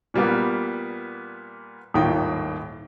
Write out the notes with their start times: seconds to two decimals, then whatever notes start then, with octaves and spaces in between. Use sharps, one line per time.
0.14 A#2 G3 A#3 B3
1.94 D#1 G#1 A2 D#3 F4 G5